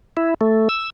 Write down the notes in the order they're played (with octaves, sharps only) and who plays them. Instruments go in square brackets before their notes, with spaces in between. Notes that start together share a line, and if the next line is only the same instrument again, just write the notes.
[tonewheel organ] E4
A3
E6